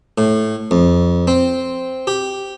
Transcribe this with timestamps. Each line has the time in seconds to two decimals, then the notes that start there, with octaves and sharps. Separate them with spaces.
0.18 A2
0.71 F2
1.27 C4
2.07 G4